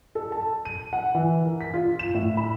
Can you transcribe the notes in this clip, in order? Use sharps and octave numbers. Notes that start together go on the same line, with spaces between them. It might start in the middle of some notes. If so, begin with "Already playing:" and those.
A4
A5
D#7
F#5
E3
A#4
B6
F4
E7
A2
B5